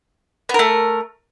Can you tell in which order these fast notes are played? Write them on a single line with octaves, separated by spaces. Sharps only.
B3 A#4 A3